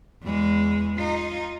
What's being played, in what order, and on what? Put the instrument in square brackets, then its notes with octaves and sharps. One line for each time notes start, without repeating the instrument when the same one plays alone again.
[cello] E2 G#3
D#4 F4